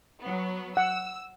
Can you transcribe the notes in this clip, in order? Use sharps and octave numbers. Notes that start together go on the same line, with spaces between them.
F#3 B3
F#5 E6